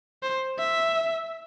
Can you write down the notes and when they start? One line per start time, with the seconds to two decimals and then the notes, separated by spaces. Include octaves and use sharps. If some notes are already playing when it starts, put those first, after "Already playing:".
0.23 C5
0.59 E5